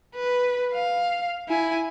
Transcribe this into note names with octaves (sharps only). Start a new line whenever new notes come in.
B4
F5
E4 G#5